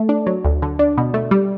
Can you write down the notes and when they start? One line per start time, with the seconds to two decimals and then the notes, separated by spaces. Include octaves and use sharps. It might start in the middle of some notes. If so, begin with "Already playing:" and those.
Already playing: A3
0.09 D4
0.27 F#3
0.44 D2
0.62 D3
0.79 D4
0.97 B2
1.14 A3
1.31 G3